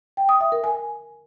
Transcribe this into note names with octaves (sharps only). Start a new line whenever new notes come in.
G5
D#6
E5
A#4
G#5